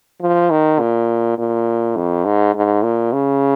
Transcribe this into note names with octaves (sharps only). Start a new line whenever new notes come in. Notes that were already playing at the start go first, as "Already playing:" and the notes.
F3
D#3
A#2
A#2
F2
G#2
G#2
A#2
C#3